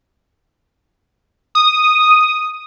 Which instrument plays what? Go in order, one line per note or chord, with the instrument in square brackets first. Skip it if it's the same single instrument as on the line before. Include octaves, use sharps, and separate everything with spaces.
[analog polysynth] D#6